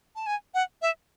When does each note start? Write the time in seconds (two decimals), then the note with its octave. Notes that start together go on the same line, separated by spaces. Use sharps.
0.16 A5
0.26 G#5
0.54 F#5
0.82 E5